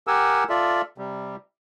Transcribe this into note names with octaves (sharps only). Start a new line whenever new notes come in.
G4 A#4 F#5 G#5 E6
F4 A4 D5 E5
C3 G3